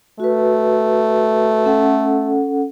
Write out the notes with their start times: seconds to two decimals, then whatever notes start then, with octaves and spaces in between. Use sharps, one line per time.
0.20 A3 F#4 B4
1.65 C#4 A4 F#5